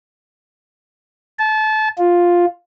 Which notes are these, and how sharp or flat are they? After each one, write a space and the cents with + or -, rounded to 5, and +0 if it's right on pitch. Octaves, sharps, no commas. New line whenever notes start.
A5 -25
F4 +5